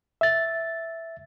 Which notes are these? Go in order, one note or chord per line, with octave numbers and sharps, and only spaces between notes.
E5 A6